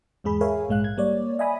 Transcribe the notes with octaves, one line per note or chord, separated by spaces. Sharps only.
E2 G#2 G#3 G#4 B5
G#4 A#4 C#5 E5 F5 G#5
A#1 G#2 G#3 F5 F#6
G#6
G3 A#3 C#5 D5
D#5 E5 G#5 B5 D#6